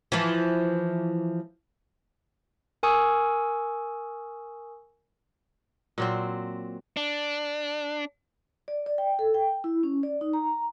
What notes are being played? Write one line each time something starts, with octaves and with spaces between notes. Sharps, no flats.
E3 F3
A#4 G#5 C#6 D#6 E6
A#2 F#3 C4
D4
D5
D5
G5
A4
G5
E4
C#4
D5
D#4
A#5